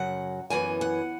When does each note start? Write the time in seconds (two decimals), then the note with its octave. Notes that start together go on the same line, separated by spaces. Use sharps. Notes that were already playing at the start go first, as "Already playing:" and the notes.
Already playing: F#2 C#3 F#3 F#5
0.50 F#2 E3 B3 G#5
0.81 F#5